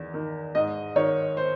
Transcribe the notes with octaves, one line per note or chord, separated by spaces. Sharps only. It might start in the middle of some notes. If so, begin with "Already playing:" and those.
Already playing: E2 D#3
D#3
G#2 D#5
D#3 C#5
C5